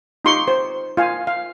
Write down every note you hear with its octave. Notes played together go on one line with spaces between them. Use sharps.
D#4 F4 G4 C6 C#6
C5
F4 F5 G#5
F5